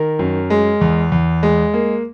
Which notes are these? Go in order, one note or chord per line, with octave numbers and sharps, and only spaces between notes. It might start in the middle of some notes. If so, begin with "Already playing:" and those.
Already playing: D#3 A#4
F#2
G#3
E2
E2
G#3
A#3